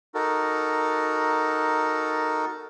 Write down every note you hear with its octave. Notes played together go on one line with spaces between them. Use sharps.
D#4 F#4 A4 A#4